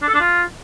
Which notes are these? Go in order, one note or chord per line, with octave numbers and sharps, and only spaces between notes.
D4
A4
D4
F4